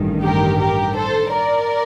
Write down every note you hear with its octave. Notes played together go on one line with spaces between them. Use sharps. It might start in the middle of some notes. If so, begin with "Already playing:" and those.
Already playing: A1 G2 D#3
G4 A#4
G4 A#4
A4 C5
A#4 D5